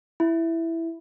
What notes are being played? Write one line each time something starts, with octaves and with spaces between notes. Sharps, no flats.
E4